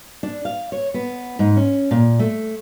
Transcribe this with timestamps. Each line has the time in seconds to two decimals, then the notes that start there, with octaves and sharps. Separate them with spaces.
0.23 D4
0.45 F5
0.72 C#5
0.94 B3
1.39 G#2
1.56 C#4
1.91 A#2
2.19 A3